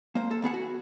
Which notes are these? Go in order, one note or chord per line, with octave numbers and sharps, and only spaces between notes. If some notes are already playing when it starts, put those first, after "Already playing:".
A#3 C5
A4
D#2 B3 G#4 F#5
F#4